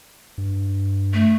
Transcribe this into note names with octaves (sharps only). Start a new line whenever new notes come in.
G2
A3